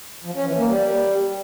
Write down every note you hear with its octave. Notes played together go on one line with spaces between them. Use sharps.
F3
C#4
E3
A#3
G3